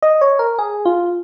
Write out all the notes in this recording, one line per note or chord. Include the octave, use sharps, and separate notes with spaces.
D#5
C#5
A#4
G#4
F4